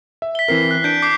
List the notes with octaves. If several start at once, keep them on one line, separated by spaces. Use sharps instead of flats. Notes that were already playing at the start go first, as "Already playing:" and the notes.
E5
B6 G7
E3 C4 A#4 B6 C7
F#6
D4 G6 D7
D6 G6 C7